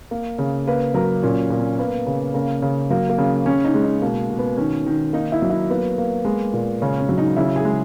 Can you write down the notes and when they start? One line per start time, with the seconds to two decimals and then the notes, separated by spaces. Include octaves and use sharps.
0.11 A#3
0.38 C#3
0.67 A#3 B4
0.94 F#3 A#4
1.23 A#2 C#4
1.50 A#2
1.59 C#4
1.79 A#3 B3
2.06 C#3
2.34 C#3 A#3
2.62 C#3
2.90 F#3 A#3
3.10 A#3
3.18 C#3
3.46 C#3 C#4
3.64 D#4
3.74 G#3
3.84 D#4
4.02 B2 A#3
4.30 B2
4.39 B3
4.57 D#3 C#4
4.86 D#3
5.13 A#3 D#4
5.32 E4
5.42 F#3
5.50 E4
5.70 A#3 B3
5.98 A#3
6.25 G#3 B3
6.53 A#2
6.82 C#3 C#4
7.00 C#4
7.09 F#3
7.18 D#4
7.37 C#3 E4
7.56 G#4
7.65 G#3